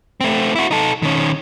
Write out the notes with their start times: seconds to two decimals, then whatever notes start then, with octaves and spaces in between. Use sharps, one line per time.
0.21 A3 C4
0.56 E4 F#4
0.71 D#4 A4
1.02 D#3 C#4